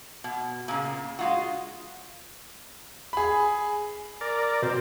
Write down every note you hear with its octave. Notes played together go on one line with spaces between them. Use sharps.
B2
A#2 C#3
G#3 F4 F#4
G#4 B5
A#4 D5
B2 C4